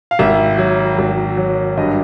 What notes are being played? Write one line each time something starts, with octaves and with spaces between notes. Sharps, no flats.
F5
G#1 E5
F#3
G#1
F#3
G2 D#5